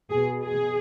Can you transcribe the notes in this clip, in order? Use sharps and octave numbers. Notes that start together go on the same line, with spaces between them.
B2 G#4
G#4